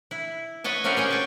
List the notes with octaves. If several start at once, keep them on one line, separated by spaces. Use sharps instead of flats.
E4
B4 C#5 D#5 A5
G3 C4 C#4 F#4 A#4 C5
C#4 G#4 C#5
G5 A5